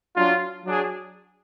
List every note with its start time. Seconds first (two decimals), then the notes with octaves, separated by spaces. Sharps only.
0.16 F#3 D4 F4
0.64 F#3 D4 G#4